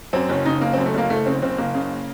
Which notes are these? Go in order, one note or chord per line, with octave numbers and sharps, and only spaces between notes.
F#2 C4
F#1 C#4
C#3 D#4
F#1 A#3
F#2 C4
A3
F#1 A#3
F#1 A3
C#3 C4
F#1 C4
F#1 A#3
C#3